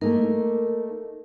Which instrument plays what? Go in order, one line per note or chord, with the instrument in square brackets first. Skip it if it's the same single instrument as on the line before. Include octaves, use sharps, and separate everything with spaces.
[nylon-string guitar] A3 A#3 D#4 [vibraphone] A#4